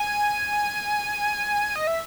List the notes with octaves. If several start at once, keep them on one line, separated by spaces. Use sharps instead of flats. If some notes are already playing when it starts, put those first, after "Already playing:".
Already playing: G#5
D#5
E5